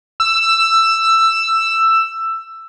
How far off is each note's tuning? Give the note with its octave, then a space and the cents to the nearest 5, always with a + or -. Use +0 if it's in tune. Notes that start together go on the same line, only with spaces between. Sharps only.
E6 +10